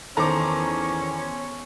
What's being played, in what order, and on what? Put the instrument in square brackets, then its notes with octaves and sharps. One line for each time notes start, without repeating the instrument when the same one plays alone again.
[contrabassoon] E2 [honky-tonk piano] D#3 A#5 [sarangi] C#4 [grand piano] A4 C5 D6